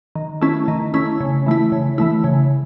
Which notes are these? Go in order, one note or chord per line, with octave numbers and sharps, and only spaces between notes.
D#3
A3 C#4 E4
D#3
A3 C#4 E4
C#3
E3 A3 E4
C#3
E3 A3 E4
C#3